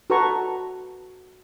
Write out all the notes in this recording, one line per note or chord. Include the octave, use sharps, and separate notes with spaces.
F#4 A4 B4 A5 A#5 C#6